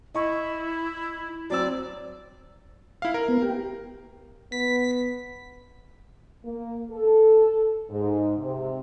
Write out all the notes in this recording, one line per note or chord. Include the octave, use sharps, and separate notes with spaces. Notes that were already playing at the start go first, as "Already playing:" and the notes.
E4 D#5 C#6
F#3 C4 D5 E6
E4 F5
A#4
B3
G4
B3 B6
A#3
A4
G#2
C3